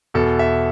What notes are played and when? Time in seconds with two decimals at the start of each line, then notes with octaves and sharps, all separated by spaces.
0.14 E2 B2 A4
0.39 E5